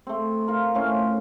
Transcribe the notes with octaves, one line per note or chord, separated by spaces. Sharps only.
A3 C4
F4 A#4
A2 A3 C#4 F4